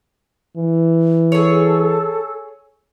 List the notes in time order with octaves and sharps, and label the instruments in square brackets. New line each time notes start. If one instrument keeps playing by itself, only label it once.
[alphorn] E3
[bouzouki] G#4 C#5 [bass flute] A4